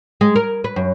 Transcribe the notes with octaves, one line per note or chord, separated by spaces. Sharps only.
G#3
A#4
B4
F#2